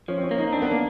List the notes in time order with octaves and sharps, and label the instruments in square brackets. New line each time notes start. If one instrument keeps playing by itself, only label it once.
[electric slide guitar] F3 [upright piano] C#4
[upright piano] C4
C#4
[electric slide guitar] A#3
[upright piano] D#4
[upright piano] C4 [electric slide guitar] D4
[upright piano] B3
A#3